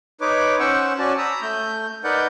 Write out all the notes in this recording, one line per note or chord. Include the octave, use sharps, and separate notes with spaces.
D#4 B4 C#5 D6
C#4 C5 F#5 C#6 E6
C#4 F#4 D5 A5
A#5 B5 D#6 E6
A3 G6
D#4 A#4 B4 D5 F#5 G6